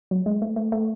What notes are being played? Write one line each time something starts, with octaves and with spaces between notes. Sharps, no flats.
F#3
G#3
A3
A3
A3